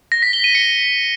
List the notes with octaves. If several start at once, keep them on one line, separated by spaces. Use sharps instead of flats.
A#6
B6
G7
D#7
C#7